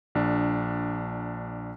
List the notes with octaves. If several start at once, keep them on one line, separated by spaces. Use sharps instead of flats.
A#1 D4